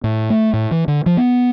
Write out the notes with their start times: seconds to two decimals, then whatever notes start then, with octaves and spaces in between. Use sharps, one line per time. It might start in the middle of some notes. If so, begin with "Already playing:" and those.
0.04 A2
0.30 A3
0.53 A2
0.71 E3
0.88 D3
1.06 F3
1.17 B3